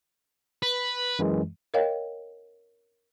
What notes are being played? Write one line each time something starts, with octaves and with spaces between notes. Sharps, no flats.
B4
F#2 E3 G#3
A#4 C#5 D#5 F5 G5